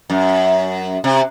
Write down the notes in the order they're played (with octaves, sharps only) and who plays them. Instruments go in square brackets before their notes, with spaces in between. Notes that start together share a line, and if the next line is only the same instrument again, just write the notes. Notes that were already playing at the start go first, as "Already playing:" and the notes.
[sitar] F#2
C3